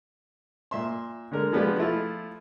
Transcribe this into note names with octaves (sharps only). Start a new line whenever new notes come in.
A#2 E5 C6
D3 G#3 A#4
F3 G#3 B3 D4 F4 G4
F3 A3 E4 F4